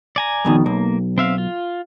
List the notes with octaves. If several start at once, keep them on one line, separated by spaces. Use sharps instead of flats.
D5 G#5 A#5
F2 B2 D#3
B1 A#3
C4 E5 F5
F4